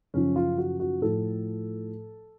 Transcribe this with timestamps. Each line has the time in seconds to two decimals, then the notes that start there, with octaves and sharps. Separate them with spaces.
0.14 F#2 C#3 F3 C#4
0.36 F4
0.58 F#4
0.80 F#4
1.02 A2 F3 A4